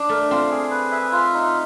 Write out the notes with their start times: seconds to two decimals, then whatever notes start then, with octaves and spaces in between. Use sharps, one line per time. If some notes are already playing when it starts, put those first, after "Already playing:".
Already playing: D4
0.09 A3 A#4
0.31 C4 F4
0.51 G#4
0.71 B4
0.92 E5
1.12 F4
1.34 D#4